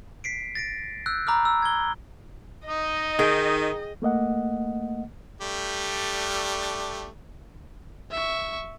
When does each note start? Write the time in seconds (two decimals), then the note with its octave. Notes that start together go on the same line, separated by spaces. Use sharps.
0.24 B6 C7 D7
0.55 A6 A#6 D7
1.06 E6 F#6 G6
1.27 A#5 B5 D6 E6 F6
1.45 E6
1.62 G#6 G7
2.66 D#4 D#5
3.19 D#3 G#4 G5
4.02 A3 A#3 D#5 F#5
5.41 G3 A3 D4
8.11 E5 C#6